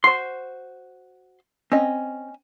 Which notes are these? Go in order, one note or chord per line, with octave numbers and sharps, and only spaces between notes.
F#4 C5 C6
C4 C#4 D#5